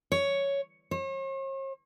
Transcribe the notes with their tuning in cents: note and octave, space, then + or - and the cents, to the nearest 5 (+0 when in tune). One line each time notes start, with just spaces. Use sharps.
C#5 +5
C#5 -45